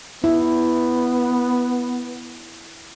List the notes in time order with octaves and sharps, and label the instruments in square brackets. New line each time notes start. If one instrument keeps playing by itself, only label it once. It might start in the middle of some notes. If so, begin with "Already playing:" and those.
[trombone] B3 [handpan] E4